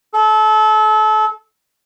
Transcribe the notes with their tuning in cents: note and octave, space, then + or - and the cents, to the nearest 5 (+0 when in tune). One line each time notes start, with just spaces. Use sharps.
A4 -30